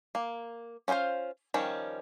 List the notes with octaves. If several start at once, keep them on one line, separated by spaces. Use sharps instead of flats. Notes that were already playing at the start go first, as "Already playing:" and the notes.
A#3
C#4 F4 G#4 C5 F5
D#3 F3 G3 C#4